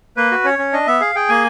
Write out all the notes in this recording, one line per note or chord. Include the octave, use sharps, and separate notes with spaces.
A#3 B4
F#4
C#4 C#5
C#4
D4 D#5
B3 E5
G#4 F5
G#4 G5
A#3 G#5